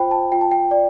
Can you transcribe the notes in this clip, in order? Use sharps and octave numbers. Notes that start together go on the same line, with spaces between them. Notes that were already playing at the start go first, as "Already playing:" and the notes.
Already playing: F4 C5 G5 B5
A5
F4 G5
A5
G5
D5